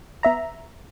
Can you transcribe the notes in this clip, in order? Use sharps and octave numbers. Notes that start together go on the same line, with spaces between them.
B3 E5 A#5